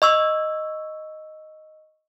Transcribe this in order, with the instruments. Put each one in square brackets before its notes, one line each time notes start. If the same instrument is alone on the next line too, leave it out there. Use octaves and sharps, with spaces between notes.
[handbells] D#5 C#6 E6